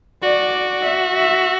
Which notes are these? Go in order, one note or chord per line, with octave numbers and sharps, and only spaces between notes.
F#4 D5
E5
E5